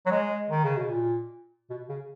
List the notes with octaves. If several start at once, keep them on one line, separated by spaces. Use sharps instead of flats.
F#3
G#3
D#3
C#3
B2
A#2
B2
C#3